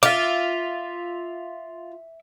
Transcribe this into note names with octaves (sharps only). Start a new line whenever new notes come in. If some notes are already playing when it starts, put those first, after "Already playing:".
F4 E5 D6